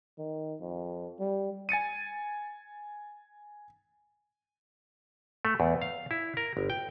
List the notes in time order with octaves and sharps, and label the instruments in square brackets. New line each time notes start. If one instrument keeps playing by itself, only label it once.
[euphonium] D#3
F2
G3
[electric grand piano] G#5 A6 C#7 D#7
[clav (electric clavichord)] A3
E2
F5
E4
A#4
G1
G5